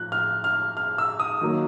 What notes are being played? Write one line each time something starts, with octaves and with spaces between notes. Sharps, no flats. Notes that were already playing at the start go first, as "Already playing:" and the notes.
Already playing: A2 F3 F#6
F6
F6
F6
E6
D#6
D#3 F#3 A#3